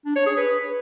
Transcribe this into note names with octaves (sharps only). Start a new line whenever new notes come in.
D4
C#5
G#4
B4